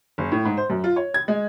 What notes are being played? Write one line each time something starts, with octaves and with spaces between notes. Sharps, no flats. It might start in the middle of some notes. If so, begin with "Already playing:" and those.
F#1
A2
G#2
C5
F#2
F4
C#5
G#6
G#3